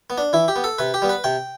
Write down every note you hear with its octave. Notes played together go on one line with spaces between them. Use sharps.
B3
D4
E3 E4
G4
B3
A4
C3 B4
G4
G3 B3
B4
C3 G5